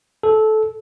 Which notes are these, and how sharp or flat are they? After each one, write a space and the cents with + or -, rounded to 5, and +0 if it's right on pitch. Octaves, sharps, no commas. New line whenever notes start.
A4 -15